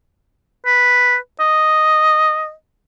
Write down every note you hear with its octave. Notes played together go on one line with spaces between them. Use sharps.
B4
D#5